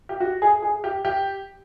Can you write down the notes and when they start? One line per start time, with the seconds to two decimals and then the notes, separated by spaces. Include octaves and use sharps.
0.09 G4
0.20 F#4
0.42 G#4
0.62 G#4
0.84 G4
1.05 G4